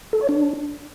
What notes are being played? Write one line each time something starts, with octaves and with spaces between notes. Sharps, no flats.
A4
C#5
D4